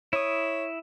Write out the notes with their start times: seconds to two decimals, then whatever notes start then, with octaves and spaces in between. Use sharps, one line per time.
0.13 E4 C#5 D#6